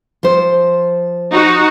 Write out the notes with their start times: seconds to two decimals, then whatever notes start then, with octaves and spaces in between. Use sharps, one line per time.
0.23 F3 C5
1.31 D#4 F#4